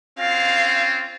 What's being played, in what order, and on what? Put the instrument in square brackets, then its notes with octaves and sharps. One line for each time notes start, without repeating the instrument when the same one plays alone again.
[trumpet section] C4 C#4 F4 [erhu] F5